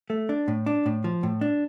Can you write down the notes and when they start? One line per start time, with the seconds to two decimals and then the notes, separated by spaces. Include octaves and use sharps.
0.10 A3
0.29 D4
0.48 A2
0.66 D4
0.86 A2
1.04 F3
1.23 A2
1.41 D4